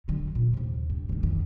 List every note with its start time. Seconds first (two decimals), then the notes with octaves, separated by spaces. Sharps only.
0.08 D3 F#3
0.35 A#2
0.54 D#2 C3
0.90 G2
1.09 D3 D#3
1.23 F2 D#3